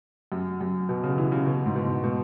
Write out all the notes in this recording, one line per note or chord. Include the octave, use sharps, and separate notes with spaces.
F#2
F#2
B2
C#3
E3
C#3
B2
G#2
B2
G#2
B2